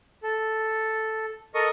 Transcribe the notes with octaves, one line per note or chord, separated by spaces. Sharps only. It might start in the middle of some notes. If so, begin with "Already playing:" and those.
A4
A4 A#4 D#5 C#6 D#6